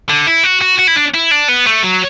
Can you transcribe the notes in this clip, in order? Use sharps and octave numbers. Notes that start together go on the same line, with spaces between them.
D3
E4
F#4
F#4
F#4
E4
D4
E4
D4
B3
A3
F#3